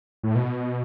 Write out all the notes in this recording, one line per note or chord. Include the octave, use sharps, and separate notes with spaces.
A2
B2